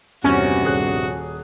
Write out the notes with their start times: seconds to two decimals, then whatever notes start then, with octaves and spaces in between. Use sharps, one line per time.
0.24 A#1 E2 G2 C3 C#4 F#4
0.63 D#1 G#4 F#6